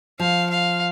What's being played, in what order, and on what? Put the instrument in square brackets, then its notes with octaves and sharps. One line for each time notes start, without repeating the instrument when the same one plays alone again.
[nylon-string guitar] F3 [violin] F5
[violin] F5